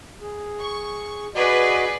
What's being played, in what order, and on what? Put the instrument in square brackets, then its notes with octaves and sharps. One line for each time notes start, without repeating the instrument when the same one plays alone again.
[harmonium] G#4
[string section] C#6
[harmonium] F#4 D#5 [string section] G#4 B4 D5